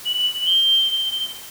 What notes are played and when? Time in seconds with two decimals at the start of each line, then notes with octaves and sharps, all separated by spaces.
0.05 F#7
0.46 G7